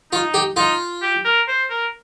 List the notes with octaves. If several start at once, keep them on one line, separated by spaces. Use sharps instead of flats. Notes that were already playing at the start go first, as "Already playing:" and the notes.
D#4 F4
G4
D#4 F4
G4
A#4
C5
A#4